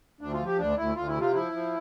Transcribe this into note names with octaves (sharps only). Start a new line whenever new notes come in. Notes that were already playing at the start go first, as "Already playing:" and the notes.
D2 D4
F4
F3
G4
D2 D4
D2 E4
D2 F4
E4
C3
F4
F3 E4
F3